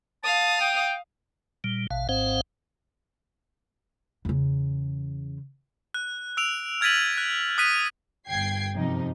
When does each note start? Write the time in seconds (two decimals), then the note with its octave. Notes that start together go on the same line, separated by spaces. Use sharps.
0.24 F5 A5 D#6
0.61 G5
1.64 A#2 G3
1.91 A1 B2 F5
2.09 G#1 G#2 C4 C5 F5 F#5
4.25 E2 C#3
5.94 F#6
6.37 E6 D7 F7
6.81 F6 G#6 A6 B6 D#7 F#7
7.18 F#6
7.58 D#6 F#6 B6 D#7
8.28 G1 G5 G#6 C7
8.75 F#2 C3 F3 D#4